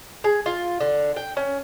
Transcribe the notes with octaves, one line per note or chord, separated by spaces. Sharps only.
G#4
F4
D3
G5
C#4